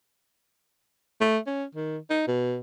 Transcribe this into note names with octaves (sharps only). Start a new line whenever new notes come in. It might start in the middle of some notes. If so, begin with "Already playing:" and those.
A3
C#4
D#3
D#4
B2